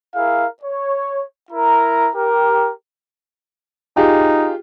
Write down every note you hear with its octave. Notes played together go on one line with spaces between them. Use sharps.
E4 G#4 A#4 F5
C#5
E4 A#4 A#5
G4 A#4
D#4 F4 G4 G#4